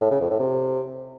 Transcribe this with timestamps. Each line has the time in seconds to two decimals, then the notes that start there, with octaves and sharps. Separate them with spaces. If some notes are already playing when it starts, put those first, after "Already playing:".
0.01 A2
0.11 C#3
0.20 F2
0.30 A2
0.40 C3